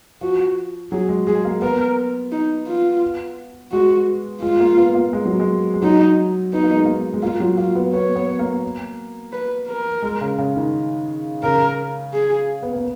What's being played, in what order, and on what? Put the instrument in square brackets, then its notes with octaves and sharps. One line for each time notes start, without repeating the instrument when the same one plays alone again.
[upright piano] F3 [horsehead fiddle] F#4
[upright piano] F#3 [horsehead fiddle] G#4
[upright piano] G#3
[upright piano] G#3 [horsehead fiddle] G#4
[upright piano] A#3
[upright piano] B3 [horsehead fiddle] A#4
[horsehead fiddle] D#4
F4
[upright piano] G#3 [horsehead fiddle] F#4
[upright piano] G#3 [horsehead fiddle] F4
[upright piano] A#3
B3
A#3
G#3
F#3
G#3
G#3
[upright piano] F#3 [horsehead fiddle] D#4
[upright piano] B3 [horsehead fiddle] D#4
[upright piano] A#3
G#3
A#3
G#3
[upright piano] A#3 [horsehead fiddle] F4
[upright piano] F#3
[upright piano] A#3 [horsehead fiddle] F4
[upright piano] B3
[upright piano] B3 [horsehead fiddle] C#5
[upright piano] B3
A#3
[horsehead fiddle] B4
A#4
[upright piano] G#3
C#3
C#3
D#3
[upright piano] C#3 [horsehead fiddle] A#4
[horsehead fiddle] G#4
[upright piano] B3
A#3